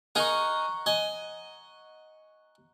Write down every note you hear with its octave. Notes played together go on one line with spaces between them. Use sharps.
D#4 G#4 A#4 F#5 A#5 C#6
D#5 G#5